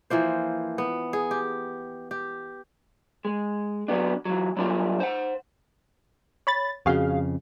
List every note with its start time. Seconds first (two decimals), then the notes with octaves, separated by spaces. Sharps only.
0.10 E3 F3 A#3 C5
0.78 B3
1.13 G#4
1.31 G4
2.11 G4
3.25 G#3
3.88 F#3 B3 D4
4.25 E3 F#3
4.57 F#3 G3 D4 D#4 F4
5.00 C5 F#5
6.47 C#5 B5 A6
6.86 F2 C#3 F#4 G#4 F5